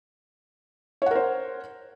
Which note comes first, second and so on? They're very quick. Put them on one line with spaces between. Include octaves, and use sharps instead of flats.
C#5 F#5 A#4 C5